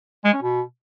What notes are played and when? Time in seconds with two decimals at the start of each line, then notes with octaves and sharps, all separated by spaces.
0.25 G#3
0.33 C#4
0.42 B2